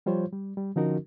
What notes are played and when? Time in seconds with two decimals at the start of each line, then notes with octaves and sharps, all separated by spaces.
0.06 F3 G3 F4 C5 C#5
0.32 G3
0.57 G3
0.76 D3 F3 C#4 D#4 F#4 A#4